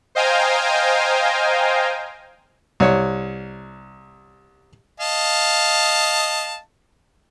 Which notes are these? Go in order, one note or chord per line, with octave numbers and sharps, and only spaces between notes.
C5 D#5 F5 G5 G#5 A#5
C2 C#5
D#5 F5 A5